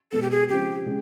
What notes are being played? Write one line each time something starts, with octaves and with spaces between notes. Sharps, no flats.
B2 G#3 B3 A4
G4
G#4
C#3 F3 G#3 C4 G4
C#3 G#3